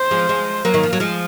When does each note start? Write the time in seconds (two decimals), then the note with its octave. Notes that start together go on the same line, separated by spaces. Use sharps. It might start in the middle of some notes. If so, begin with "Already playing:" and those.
Already playing: C5
0.11 F3 G#3
0.29 F3 G#3
0.65 F#3 A#3
0.74 D#3
0.83 F3
0.93 F#3
1.00 F3 G#3